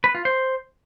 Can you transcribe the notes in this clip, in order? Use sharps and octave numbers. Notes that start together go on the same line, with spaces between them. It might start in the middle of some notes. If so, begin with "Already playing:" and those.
B4
F4
C5